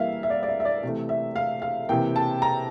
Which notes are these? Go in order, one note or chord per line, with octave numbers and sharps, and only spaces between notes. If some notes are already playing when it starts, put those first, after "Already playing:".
Already playing: E3 G3 A#3 E5 F5
E5
D5
D5
E5
E5
D5
C3 E3 A3
E5
F5
F5
C3 E3 A#3 G5
A5
A#5